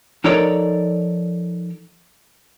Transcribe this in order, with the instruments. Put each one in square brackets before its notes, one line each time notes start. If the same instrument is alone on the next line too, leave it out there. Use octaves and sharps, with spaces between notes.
[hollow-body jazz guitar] F3 D#4 A4 A#4 C#5 D5